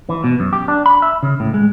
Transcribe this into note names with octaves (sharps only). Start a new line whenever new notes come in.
E3
B2
F#2
G4
D4
B5
E5
C#3
A2
G#3